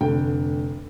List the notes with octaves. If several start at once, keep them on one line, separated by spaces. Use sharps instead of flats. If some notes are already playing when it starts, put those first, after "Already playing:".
F1 D3 G5